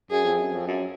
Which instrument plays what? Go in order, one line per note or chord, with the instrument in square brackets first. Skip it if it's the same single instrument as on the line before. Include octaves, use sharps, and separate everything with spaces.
[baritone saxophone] F#2 [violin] G#4
[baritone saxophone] F2
F#2
F2
F#2